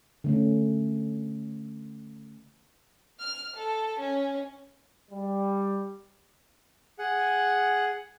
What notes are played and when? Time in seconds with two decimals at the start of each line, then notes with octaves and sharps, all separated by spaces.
0.24 D3 A3 C#4
3.20 F6
3.56 A4
3.99 C#4
5.11 G3
6.99 G#4 F#5